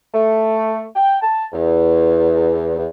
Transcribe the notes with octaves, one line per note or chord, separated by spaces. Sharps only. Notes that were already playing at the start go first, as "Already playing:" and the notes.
A3
G5
A5
E2
E2